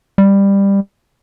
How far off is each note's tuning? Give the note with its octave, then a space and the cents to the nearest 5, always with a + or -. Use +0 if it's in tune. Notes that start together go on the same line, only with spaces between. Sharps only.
G3 +15